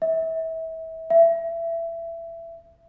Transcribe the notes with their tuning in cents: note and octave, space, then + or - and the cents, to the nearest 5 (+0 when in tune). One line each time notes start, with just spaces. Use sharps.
E5 -30
E5 +20